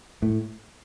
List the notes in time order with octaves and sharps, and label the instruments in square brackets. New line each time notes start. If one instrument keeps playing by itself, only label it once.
[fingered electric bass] A2